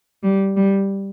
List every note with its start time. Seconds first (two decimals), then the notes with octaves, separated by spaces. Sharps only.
0.23 G3
0.56 G3